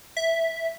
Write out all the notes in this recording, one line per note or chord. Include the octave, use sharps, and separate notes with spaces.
E5